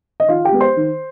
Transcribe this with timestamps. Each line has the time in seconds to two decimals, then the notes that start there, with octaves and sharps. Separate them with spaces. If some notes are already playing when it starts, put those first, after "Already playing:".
0.20 D#5
0.29 D#3 F4 F5
0.45 G4 G5
0.52 G#3 B3
0.60 C5 C6
0.76 D#3